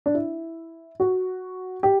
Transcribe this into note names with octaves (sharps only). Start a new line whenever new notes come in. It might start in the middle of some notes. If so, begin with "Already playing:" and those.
D4
E4
F#4
G4